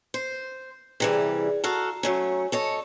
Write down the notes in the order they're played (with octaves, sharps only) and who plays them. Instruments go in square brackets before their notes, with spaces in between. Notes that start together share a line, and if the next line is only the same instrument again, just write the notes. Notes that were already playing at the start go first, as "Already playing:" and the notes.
[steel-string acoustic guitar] C5
[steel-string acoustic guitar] C3 E3 G3 [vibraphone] G#4 D5
[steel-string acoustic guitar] F#4 A4 F5 [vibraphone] A#5
[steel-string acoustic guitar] F#3 A3 C#4
A4 C#5 D#5